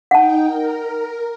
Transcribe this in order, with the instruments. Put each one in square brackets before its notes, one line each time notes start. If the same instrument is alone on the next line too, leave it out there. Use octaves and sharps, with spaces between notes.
[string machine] D#4 G5 [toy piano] F#5 A5
[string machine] A#4